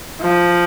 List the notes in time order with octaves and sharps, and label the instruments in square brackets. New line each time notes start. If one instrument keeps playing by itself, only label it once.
[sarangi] F3